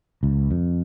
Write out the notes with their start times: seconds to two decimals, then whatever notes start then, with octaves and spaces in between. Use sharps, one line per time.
0.23 C#2
0.51 F2